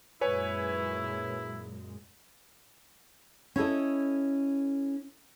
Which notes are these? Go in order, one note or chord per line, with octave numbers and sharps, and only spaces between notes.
F#2 A#2 G#3 E4 B4 C#5 G#5
C#4 E4 A4 D#5